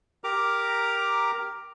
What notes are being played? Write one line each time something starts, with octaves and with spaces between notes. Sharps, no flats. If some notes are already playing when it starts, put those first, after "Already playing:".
G4 A#4 A#5 D6